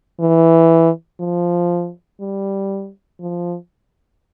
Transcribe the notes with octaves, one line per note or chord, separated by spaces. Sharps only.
E3
F3
G3
F3